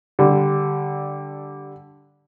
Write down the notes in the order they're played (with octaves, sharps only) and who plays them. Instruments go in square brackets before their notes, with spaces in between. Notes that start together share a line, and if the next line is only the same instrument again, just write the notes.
[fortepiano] D3 G3